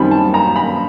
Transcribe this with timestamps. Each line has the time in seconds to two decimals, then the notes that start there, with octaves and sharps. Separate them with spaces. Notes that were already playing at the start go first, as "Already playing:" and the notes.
Already playing: F#2 D#3 G3 C4 D#4 B5
0.11 A5
0.34 A#5
0.56 B5